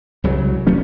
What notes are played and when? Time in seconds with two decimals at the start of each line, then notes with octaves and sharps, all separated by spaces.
0.24 C2 C#3 F#3
0.67 D#1 F#3 A3 C#4